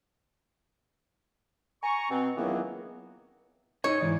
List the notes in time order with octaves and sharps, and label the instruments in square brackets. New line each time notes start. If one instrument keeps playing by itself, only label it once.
[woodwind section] G#5 A#5 C#6
B2 C4
C#2 D#3 E3 F#3 A#3 B3
[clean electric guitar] D#4 G#4 D#5 [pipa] C#5
[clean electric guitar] G#2 E3 D5